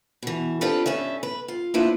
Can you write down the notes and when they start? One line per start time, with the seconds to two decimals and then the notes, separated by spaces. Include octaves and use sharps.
0.23 B2 E3
0.61 C4 D4 F4 G4 A4 B4
0.86 G2 C#4 A4 E5
1.23 B4
1.48 F4
1.74 A#3 D4 E4 F4 B4 C5